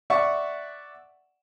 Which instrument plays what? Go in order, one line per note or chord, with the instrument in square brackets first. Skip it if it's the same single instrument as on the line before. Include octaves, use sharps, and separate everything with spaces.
[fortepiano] D5 E5 F#5 C#6